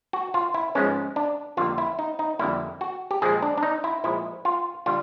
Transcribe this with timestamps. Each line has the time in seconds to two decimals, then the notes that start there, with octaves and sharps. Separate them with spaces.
0.13 F#4
0.34 F4
0.54 E4
0.75 G#2 F3 G#3 B3 C#4
1.16 D4
1.57 F2 D3 G3 A#3 F4
1.78 E4
1.99 D#4
2.19 D#4
2.39 F2 D3 G3 A#3 E4
2.81 F#4
3.11 G4
3.22 A#2 F3 G#3 G#4
3.42 D4
3.58 D4
3.63 D#4
3.84 E4
4.04 A#2 F3 G#3 E4
4.45 F4
4.86 D3 G3 F4